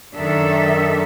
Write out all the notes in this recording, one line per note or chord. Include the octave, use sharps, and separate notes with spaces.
F#2 D#3 D4 A4 E5